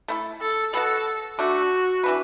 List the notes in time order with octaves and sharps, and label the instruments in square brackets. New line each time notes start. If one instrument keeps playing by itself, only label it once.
[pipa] A3 E4 A4
[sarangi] A4
[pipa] B2 B3 F#4 [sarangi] A4
[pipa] D3 A3 D4 [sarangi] F#4
[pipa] E3 D4 B4